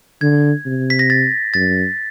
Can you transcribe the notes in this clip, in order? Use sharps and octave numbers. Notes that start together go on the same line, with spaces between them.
D3 G#6
C3
B6
A#6
A6
F#2 A6